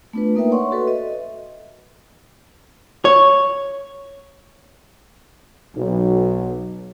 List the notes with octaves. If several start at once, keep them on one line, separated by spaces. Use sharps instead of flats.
A3 B3 D4 F4 B4
A#3 D#4 A#4 B4 E5 G5
C#5 D5 F#5 C6 C#6
F#4 A4 B4 E5
D#5 E5
C#5
B1